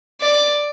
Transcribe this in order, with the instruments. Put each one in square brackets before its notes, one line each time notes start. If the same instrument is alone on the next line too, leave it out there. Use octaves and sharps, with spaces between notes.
[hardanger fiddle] D5